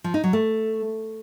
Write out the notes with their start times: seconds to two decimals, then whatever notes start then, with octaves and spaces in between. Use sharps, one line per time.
0.04 F3
0.14 D#4
0.24 F#3
0.33 A3